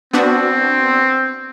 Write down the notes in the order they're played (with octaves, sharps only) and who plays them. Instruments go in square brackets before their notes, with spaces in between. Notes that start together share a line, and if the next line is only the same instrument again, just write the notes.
[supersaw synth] B3 D4 F#4 [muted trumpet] C4